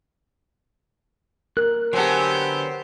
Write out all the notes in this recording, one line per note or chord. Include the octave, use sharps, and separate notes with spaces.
A#4 F#6
D3 F#3 B3 G4 C5 G#5 A5